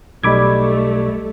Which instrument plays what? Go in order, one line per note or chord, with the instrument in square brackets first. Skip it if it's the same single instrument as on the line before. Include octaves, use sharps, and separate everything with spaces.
[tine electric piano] B1 G3 [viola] A3 [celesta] D#5 E6 [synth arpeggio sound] B5 D6 G#6